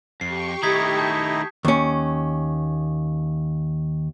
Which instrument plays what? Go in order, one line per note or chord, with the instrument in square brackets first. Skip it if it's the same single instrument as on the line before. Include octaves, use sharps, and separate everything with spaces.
[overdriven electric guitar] F2 [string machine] G4 C#6 [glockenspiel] C7
[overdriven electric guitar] D#3 A3 [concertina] D#4 E4 [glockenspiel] D#6 G#6 B6
[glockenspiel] A5 G6
[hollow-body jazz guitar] D#2 C#4